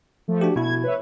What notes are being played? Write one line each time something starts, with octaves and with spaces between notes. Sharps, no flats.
F3 A3
D4 F#4 G4
B2 E4 G#6
B4 C#5 E5